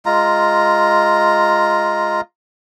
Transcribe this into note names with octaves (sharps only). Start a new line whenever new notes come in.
G#3 F4 A#5